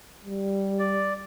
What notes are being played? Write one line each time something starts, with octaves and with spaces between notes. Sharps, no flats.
G3
D5